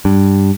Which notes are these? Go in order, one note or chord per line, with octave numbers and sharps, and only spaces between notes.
G2